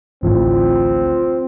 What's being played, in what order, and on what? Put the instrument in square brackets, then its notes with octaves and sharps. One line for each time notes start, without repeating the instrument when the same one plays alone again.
[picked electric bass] A1 D2 A2 [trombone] C4 [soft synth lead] F4